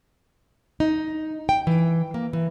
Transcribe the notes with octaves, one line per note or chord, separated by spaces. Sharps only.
D#4
G5
E3
A#3
E3